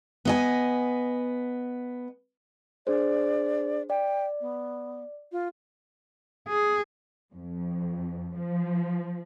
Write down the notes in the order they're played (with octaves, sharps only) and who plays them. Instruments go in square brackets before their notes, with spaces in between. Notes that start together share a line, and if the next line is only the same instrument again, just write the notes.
[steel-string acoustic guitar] B3 D#5 G#5
[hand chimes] D4 G#4 C5 [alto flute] D5
[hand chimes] D5 [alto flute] G5
[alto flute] B3
F4
[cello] G#4
[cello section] F2
F3